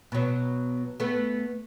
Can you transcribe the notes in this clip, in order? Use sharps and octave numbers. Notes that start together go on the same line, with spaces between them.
B2 F#3
A3 B3